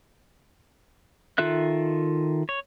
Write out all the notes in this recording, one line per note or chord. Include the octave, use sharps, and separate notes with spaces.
D#3 F4 A4 E5 F#6
C#5